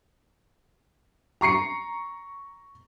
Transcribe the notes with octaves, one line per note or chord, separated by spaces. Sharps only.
A#5 C#6 C7 C#7